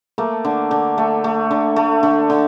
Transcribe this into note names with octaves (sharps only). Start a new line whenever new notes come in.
A3 A#3
D3
D3
A3
A3
D3
A3
D3
D3